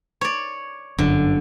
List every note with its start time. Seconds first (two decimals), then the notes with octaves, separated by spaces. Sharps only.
0.21 C#5 D5
0.98 G1 F#2 D3